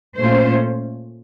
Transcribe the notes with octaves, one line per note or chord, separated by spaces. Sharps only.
A#2 A3 C#4 F4 C5